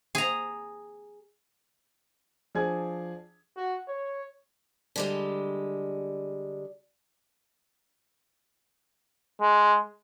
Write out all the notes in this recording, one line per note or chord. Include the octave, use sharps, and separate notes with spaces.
G#4 A#5
F3 D4 G#4 G#6
F#4
C#5
D3 G3 G#3
G#3